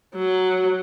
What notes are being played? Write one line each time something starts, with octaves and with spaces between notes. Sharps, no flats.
F#3